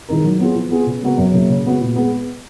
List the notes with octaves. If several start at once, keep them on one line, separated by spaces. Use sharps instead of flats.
D#3 G#3 D#4 A#4
F#3
B3 F4 G#4
F3
B3 F4 G#4
C#3
G#3 B3 F#4 A#4
F#2
C#3 F#3 A#3
C#3
G#3 B3 F#4
A#2
G#3 B3